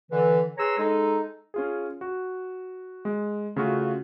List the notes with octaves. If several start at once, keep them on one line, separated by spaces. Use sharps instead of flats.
D3 E3
G#4 B4 C#5 A#5 C6 E6
G#3 D#4 A4
C#4 F4 G#4
F#4
G#3
C#3 A3 F4 F#4